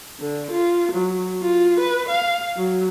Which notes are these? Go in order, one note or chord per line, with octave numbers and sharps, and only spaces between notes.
D3
F4
F#3
F4
B4
F5
F#3